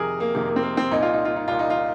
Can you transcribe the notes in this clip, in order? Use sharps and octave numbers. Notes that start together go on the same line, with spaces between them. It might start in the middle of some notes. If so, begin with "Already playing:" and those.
Already playing: F2 C3 D#3 G#4 A#4
A#3
F2 C3 D#3 A#3
A#3
C4
A#3
C4
C2 A#2 D#4
F4
D#4
F4
D#4
C2 A#2 F4
D#4
F4